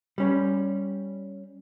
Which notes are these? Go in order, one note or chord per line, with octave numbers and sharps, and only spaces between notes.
G3 C#4